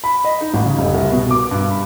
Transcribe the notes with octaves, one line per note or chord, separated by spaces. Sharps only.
B5
D#5
D#4
A1
C#3
F1
C2
B2
D6
G2
B5